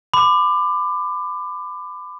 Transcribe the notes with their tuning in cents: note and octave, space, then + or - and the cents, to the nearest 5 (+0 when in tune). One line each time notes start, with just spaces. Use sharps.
B5 +30 D6 +20